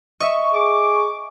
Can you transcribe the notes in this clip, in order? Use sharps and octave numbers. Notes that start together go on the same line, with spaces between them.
D#5 E5 C#6
G#4 D6